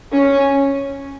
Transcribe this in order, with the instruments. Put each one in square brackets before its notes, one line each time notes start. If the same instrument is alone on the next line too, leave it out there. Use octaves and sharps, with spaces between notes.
[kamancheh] C#4